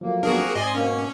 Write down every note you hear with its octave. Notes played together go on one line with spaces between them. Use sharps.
F3 F#3 A3 A#3
B3 D4 F#4 G#4 A#4
C4
G#2 D5 D#5 G#5 C6
B2 A#3 C#4